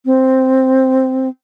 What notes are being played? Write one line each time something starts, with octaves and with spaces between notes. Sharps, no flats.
C4